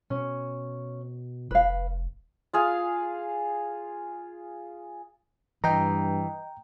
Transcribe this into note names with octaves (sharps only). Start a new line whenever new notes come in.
B2 C#4
F1 B4 F5
F4 G#4 F5
G2 E3 D#5 G5 A#5